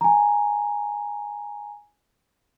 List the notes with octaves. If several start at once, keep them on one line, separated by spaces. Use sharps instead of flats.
G#5 A#5